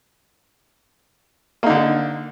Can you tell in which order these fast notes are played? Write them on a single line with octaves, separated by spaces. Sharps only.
A#3 D#4 D3